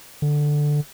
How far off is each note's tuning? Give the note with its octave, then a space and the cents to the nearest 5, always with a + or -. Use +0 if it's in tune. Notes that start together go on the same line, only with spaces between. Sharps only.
D3 +5